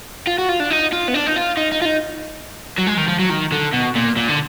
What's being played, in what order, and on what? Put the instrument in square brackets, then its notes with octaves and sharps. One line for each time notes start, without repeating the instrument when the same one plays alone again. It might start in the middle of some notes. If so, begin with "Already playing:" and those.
[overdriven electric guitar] F4
F#4
F4
D4
D#4
F4
B3
D4
D#4
F4
D#4
D#4
F4
D#4
F#3
G#3
D#3
F3
F#3
D#3
D3
B2
A#2
A#2
D3